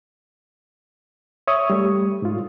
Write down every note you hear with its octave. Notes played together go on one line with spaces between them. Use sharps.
C#5 E5 C#6 D#6
G3 A3
G#2 F4